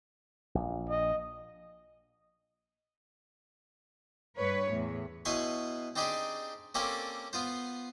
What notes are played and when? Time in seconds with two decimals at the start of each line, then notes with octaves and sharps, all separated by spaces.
0.55 A#1
0.89 D#5
4.37 G2 B4 C#5
4.71 E2 A2
5.25 B2 E4 B4 C#5 G#5 C6
5.96 C4 D4 D#4 G4 G#4 D5
6.75 A#3 C4 C#4 G4 A4 D5
7.33 B3 F4 C5